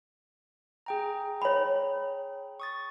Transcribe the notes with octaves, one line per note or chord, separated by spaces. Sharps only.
G#4 G5 A#5
C#5 B5
C#6 D#6 A6